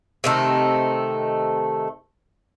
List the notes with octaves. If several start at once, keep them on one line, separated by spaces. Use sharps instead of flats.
C3 D#3 A3